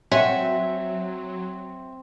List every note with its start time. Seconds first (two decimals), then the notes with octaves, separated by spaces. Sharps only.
0.12 F#3 C4 C#5 E5 F#5 G#5